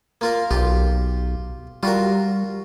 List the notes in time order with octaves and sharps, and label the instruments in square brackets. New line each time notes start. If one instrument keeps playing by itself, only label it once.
[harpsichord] A#3 F4 A#4
[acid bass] B1 [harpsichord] F4 G4
[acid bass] G3 [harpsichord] F4 F#4 A#4